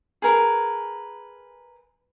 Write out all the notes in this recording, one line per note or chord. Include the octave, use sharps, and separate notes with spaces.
G#4 A#4 B4